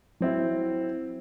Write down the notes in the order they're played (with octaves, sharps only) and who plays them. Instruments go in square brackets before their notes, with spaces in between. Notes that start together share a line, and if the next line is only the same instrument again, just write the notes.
[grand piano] F#3 C4 E4